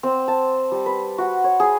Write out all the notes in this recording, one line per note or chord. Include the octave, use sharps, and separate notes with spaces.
C4
A5
G3
B4
F#4
C#5
G#4